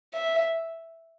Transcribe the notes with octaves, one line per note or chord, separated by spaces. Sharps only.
E5